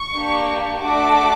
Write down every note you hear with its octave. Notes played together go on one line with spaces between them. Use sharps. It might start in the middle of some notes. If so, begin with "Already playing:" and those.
Already playing: C#6
A#3 D4 G4
A3 D4 F#4 A4 D6